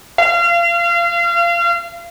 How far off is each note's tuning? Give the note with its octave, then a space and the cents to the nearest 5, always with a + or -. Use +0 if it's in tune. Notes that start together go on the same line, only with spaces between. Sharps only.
F5 -30